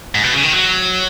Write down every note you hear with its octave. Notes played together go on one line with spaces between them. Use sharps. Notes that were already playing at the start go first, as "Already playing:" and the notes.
G#2
B2
C#3
D#3
F#3